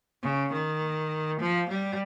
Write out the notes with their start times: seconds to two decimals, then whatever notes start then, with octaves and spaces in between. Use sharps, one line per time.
0.23 C#3
0.52 D#3
1.40 F3
1.69 G3